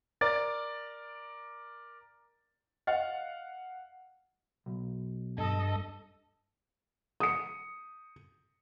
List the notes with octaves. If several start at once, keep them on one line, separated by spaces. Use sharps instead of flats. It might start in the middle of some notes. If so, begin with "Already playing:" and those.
A#4 D5 A6
D#5 F5 F#5
B1
G2 A4 D#5
D#6 C#7